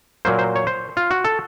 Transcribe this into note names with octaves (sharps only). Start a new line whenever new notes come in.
A#2 F#3 A#3 C5
C5
C#5
C5
F4
F#4
A4